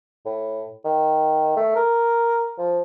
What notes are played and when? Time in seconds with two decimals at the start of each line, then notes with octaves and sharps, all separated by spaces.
0.25 A2
0.85 D#3
1.56 A3
1.76 A#4
2.58 F3